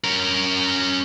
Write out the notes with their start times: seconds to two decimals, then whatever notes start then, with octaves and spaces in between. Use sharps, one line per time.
0.04 C#4 A#4